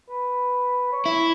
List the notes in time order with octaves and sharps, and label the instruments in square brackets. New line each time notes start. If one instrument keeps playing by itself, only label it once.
[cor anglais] B4
C#5
[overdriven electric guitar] E4